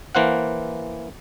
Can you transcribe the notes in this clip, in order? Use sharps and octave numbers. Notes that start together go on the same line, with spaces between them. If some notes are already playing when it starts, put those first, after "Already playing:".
E3 A#3 C5 F5 F#5